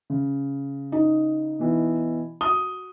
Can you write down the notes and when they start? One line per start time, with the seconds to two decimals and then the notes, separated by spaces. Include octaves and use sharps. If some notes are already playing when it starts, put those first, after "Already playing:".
0.10 C#3
0.92 D#4
1.59 B2 E3
2.41 F#4 D#6 G7